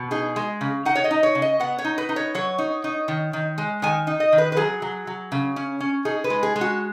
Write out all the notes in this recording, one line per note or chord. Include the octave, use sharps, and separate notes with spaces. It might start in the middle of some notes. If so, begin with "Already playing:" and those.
Already playing: B2
D#4 G#4
G#3
C#3
D#4 F#5
C#5
D#5
D#4
C#5
C#3
D#5
B3 F#5
C#5
D#4
B4
D#4
C#5
F#3 C#5
D#4
D#4
D#3
D#3
G#3
D#3 G#5
D#4
D#5
D#3
B4
B4
F#3 G#4
F#3
F#3
C#3
C#4
C#4
D#4 G#4
B4
G#3
G#4
G#3
F#4